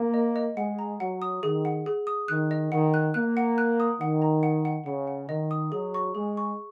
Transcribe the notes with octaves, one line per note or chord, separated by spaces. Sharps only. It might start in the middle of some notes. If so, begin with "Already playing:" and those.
Already playing: A#3
D#5
D#5
G#3 F#5
A#5
F#3 F#5
D#6
D#3 G#4
F#5
G#4
D#6
D#3 F#6
D#5
D#3 F#5
F#6
A#3 F#6
F#5
F#6
D#6
D#3 F#5
A#5
F#5
F#5
C#3 F#5
F#5
D#3 D#5
D#6
F#3 G#4
C#6
G#3 G#4
C#6